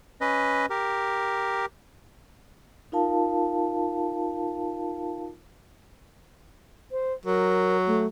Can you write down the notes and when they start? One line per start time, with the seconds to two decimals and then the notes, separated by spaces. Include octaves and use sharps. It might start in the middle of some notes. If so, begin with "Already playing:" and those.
0.21 C#4 B4 D#5
0.70 G4 A#4
2.92 D#4 F4 A#4 F5 A5
6.92 C5
7.25 F#3 A#4
7.87 A3